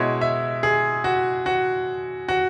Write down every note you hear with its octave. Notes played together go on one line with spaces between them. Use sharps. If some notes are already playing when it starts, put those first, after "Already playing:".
Already playing: B2 G#3 E4 C#5
E5
G#4
F#4
F#4
F#4